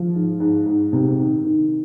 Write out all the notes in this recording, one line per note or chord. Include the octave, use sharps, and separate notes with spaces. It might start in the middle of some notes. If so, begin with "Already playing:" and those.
Already playing: F3
G#2
G#2
G#2
C3
D#3
D#3